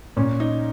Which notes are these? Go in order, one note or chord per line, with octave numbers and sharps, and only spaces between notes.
A#2 C#4
D#4